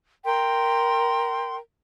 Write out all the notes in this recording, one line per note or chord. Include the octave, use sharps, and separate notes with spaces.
A#4 G5 C6